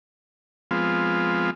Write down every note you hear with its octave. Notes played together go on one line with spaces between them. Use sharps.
F3 G#3 B3 C4 F4